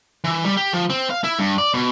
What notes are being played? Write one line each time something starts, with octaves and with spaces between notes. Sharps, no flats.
E3
G3
G4
F3
C4
F5
E4
G2
D5
B2